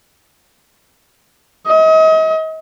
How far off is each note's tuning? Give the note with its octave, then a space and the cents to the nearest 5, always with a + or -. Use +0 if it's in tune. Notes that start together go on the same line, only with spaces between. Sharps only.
D#5 +35